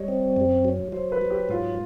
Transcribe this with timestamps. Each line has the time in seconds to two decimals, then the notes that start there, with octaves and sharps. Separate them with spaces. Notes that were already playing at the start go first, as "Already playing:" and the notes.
Already playing: G3 C#5 D#5
0.08 C4
0.36 F#2
0.65 F#3
0.92 F#3 C5
1.12 B4
1.21 F#3
1.30 G4
1.49 G#2 F4